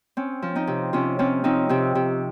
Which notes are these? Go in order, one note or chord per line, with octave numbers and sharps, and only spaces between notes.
C4 C#4
F3
C4 D#4
C3
C3 C#4 F4
C4 C#4 F4
F3 C4 D#4
C3 C4
C3